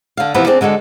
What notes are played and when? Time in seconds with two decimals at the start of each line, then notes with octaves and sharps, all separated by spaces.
0.17 D3 F5
0.34 C3 E3 F3 B3 B4
0.47 C4 D4 G#4 D5
0.61 D3 G#3 F#4 A4